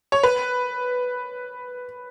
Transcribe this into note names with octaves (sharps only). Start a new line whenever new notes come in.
C#5
B4